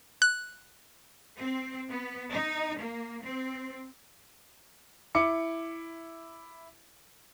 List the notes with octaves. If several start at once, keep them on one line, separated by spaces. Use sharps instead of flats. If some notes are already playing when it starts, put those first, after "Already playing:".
F#6
C4
B3
D#4
A#3
C4
E4 D6 C#7